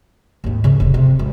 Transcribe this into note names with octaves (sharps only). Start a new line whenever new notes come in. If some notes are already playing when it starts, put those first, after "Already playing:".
D#2 G#2
C#3 F3
F1 D3
C3
G#1